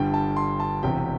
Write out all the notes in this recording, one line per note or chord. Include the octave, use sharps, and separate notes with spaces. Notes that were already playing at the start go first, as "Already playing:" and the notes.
Already playing: G1 G2 D3 G3 G5
A5
C6
A5
E1 E2 C3 G5